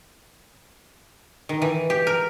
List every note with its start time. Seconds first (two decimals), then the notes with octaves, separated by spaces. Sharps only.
1.49 D#3
1.62 E3
1.90 G4
2.07 A#4